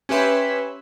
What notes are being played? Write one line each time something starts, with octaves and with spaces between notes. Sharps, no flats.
C#4 G4 B4 E5 C6